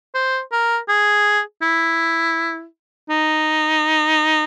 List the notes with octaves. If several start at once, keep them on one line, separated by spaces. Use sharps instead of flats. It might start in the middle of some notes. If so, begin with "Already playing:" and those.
C5
A#4
G#4
E4
D#4